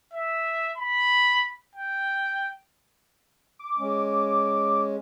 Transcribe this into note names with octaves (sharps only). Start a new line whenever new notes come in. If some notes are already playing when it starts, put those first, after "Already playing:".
E5
B5
G5
D6
G#3 C#4